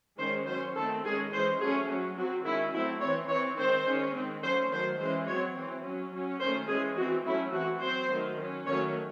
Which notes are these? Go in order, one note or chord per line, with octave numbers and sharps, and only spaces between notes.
D#3 G#3 C#4 C5
F#3 C#4 C5
D#3 A3 C4 A4
D#3 G#3 C#4 G#4
E3 G#3 C#4 C5
F#3 A3 C#4 G#4
F#3 C#4
F#3 C4 F#4
D#3 G#3 C#4 E4
F#3 A3 C4 E4
E3 C4 C#5
E3 C4 C#5
D#3 G#3 C4 C5
D#3 G#3 C#4
D#3 G#3 C4
F#3 A3 C#4 C5
D#3 F#3 A3 C5
E3 G#3 C#4 C5
F#3 C4 C#5
E3 C4
F#3 C#4
F#3 C#4
D#3 A3 C#4 C5
E3 G#3 C#4 G#4
E3 C4 F#4
F#3 A3 C#4 E4
E3 C4 F#4
F#3 C4 C5
D#3 F#3 A3
F#3 C#4
D#3 F#3 A3 C#4 C#5